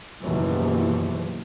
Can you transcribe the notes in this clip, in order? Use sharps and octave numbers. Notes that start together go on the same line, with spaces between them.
F#1 D#2 B2 E3 F3